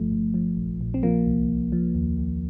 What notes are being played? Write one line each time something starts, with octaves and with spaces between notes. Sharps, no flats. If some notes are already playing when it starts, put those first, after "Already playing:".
Already playing: G1 F3 A3
G1
F3
A#1
A#1
C4
F3 A#3
C2
C2
F3
D#2
D#2